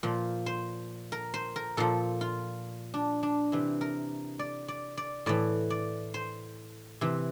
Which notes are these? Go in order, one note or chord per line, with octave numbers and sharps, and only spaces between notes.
A#2 F3
C5
A#4
C5
A#4
A#2 F3 A4
F4
D4
D4
C3 E3
A#4
D5
D5
D5
A2 E3 D5
D5
C5
C3 E3